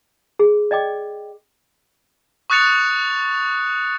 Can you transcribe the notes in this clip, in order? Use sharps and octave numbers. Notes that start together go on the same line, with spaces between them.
G#4
D5 D#5 G5 D6
C#6 D#6 F#6 A6 C#7 F7